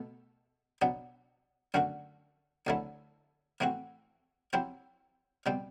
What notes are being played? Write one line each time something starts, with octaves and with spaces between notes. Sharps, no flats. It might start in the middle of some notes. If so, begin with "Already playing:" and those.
Already playing: B2 A3
B2 F#3 B3 D4
F#2 D3 A3 D4 F#4
D2 D3 F#3 A3 E4
A2 E3 A3 C4 F#4
F#3 C4 E4 G4 C5
B2 G3 C4 G4